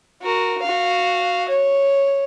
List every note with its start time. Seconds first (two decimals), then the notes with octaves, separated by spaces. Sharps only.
0.22 F#4 A#4
0.62 F#4 F5
1.49 C#5